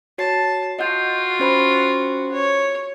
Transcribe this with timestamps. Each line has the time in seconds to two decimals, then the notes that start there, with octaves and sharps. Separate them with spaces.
0.18 F#4 C#5 A5 C7
0.79 F4 F#4 D#5 F#5 G6
1.40 C#4 C5 B5
2.32 C#5